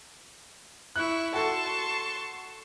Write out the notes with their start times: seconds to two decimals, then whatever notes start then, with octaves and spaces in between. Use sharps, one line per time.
0.96 E4 C#6 F#6
1.34 F#4 A4 A5 C6 C#6